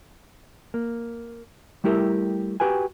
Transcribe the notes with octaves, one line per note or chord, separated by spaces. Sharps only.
A#3
G3 A3 E4 G4 A#4 E5
F#4 G4 B4 G5 G#5